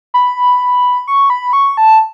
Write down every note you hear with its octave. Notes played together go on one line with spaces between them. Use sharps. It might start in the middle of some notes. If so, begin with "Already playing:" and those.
B5
C#6
B5
C#6
A5